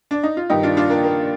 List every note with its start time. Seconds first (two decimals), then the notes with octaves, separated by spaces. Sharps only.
0.11 D4
0.23 D#4
0.37 F4
0.50 G2 D#3 D#4 G4
0.63 D4 F4
0.77 D4 F4
0.90 A#3 D4
1.04 A#3